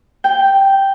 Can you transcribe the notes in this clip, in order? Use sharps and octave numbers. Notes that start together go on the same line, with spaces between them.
G5